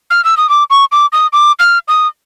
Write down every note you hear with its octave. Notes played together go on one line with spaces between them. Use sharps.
F6
E6
D#6
D6
C#6
D6
D#6
D6
F6
D#6